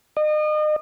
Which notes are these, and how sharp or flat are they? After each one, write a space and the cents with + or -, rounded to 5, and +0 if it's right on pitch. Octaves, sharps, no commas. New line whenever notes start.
D#5 -35